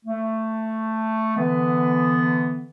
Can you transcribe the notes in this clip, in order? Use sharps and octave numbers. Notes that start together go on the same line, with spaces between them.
A3
D3 E3 B3